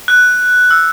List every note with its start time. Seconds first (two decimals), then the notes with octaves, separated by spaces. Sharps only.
0.08 F#6
0.71 E6